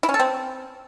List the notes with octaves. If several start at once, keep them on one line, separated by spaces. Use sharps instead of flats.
E4
C#4
A4
C4